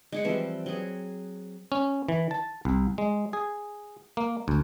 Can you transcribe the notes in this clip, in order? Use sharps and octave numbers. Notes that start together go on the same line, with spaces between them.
G#3 G#4 F#5
E3 F3 G3 C4
F#3 G#4
C#4
E3
A5
C2
G#3
G#4
A#3
D2